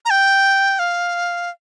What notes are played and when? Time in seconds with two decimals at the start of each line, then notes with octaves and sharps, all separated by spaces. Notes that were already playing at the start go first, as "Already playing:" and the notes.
0.05 A#5
0.10 G5
0.79 F5